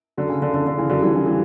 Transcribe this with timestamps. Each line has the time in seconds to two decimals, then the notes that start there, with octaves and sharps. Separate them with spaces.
0.17 D3 F#3
0.29 C#3
0.42 D3
0.54 D3
0.66 D3
0.78 C#3 E3
0.89 D3 F#3
1.02 E3 G3
1.14 C#3 E3
1.26 E3 G3